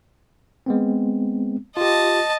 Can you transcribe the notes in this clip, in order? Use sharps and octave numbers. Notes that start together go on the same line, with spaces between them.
G#3 B3 C4
F4 G4 D#5 A5